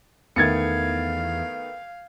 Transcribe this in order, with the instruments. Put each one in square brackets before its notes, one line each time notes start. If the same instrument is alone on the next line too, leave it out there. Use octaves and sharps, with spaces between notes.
[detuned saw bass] E2 [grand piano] D#3 A3 B3 [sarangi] F5 [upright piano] G#6 A6 C#7